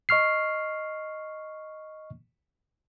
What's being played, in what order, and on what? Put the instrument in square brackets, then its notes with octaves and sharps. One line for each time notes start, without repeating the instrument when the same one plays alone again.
[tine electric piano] D#5 C#6 F6 C7